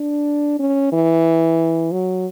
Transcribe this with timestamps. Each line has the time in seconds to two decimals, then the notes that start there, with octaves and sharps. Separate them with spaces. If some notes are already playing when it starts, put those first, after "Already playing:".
Already playing: D4
0.59 C#4
0.93 E3
1.92 F#3